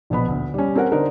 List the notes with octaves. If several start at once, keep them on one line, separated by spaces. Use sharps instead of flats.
A#1 B2 B3 B5
D2
G3 C#4
C4 C#4 A#4 F#5
D3 D#4 A#4 C5